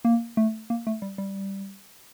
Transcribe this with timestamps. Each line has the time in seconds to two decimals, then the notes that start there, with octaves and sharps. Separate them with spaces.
0.05 A#3
0.37 A3
0.70 A#3
0.87 A3
1.02 G3
1.18 G3